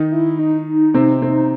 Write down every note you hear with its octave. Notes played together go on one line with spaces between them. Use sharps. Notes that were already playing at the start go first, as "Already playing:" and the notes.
Already playing: D#3 D#4
E4
D#4
C3 C4
C3 C4